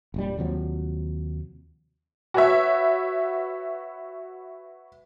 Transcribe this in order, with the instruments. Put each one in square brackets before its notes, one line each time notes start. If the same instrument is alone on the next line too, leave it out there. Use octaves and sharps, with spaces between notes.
[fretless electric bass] F1 A#1 G3
D#2 C3 F3 F#3
[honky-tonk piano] F#4 B4 C#5 E5